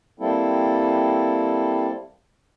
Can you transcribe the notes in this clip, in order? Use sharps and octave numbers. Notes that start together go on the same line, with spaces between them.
G3 A#3 C4 E4 A4